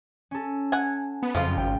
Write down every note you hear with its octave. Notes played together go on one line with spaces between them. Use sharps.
C#4 A4
F#5 G#5
B3
F#1 F2 F3 F4
G#1 G5